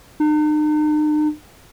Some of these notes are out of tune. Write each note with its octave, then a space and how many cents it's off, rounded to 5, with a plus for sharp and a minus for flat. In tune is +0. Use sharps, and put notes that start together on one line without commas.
D#4 -45